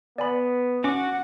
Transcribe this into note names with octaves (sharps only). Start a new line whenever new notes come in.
B3 D5 G#5 B5
C#4 F#4 F#5 D6